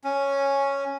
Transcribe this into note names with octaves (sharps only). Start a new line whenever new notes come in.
C#4